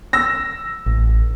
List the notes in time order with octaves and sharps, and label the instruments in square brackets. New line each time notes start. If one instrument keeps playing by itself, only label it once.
[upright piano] E6 A#6
[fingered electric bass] A1